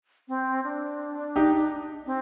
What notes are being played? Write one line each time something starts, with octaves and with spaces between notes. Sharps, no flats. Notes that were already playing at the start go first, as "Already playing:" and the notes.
C4
D4
D#4 G4
C4